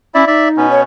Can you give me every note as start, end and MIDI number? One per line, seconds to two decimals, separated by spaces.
0.15 0.25 61
0.15 0.25 64
0.15 0.25 74
0.15 0.25 76
0.27 0.67 63
0.27 0.48 74
0.27 0.48 76
0.57 0.83 47
0.57 0.83 59
0.57 0.83 61
0.71 0.80 73